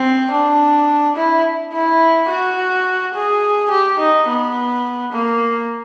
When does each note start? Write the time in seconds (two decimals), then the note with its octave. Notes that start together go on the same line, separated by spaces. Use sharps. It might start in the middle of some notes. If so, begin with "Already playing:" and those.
Already playing: C4
0.31 D4
1.16 E4
1.73 E4
2.29 F#4
3.14 G#4
3.71 G4
3.99 D#4
4.27 B3
5.12 A#3